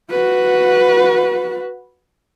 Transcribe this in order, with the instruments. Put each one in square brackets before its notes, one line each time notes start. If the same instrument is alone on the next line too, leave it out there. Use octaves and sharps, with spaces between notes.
[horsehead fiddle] F#4 B4